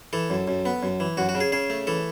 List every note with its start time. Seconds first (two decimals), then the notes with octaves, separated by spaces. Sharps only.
0.13 E3 A4
0.30 F#2
0.48 F#2
0.66 B3
0.83 F#2
1.00 E3
1.17 F#2 F#4
1.29 F#4
1.35 C#3
1.40 G#4
1.52 C#3 G#4
1.70 A3
1.87 E3 A4